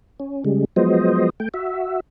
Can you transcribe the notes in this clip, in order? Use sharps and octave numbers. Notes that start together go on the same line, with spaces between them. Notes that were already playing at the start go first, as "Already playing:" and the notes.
C#4
C#3 G3 G#3
F3 F#3 G#3 B3 C5 D#5
A3 G5
F#4 E5